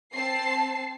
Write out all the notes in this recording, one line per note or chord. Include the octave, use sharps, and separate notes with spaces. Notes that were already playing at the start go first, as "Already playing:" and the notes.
C4 A5 C7